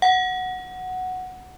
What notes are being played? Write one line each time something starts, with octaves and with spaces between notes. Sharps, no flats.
F#5